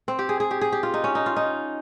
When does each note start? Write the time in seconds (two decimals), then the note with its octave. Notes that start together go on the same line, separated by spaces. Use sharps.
0.08 C4
0.19 G4
0.29 G#4
0.40 G#4
0.51 G4
0.61 G#4
0.72 G4
0.83 F4
0.94 D#4
1.04 C#4
1.15 D#4
1.26 F4
1.36 D#4